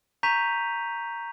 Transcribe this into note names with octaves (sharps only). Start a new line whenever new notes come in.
A#5 C#6 G6 B6 D#7 F7